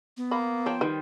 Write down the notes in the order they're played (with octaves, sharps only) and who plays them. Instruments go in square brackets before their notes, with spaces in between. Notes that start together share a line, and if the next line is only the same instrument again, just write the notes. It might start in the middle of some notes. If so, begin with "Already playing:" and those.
[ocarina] B3
[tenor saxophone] A#3 [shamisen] B5
[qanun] F3 C5 G5 [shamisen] C#5 A5
[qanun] D#3 G3 [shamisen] B4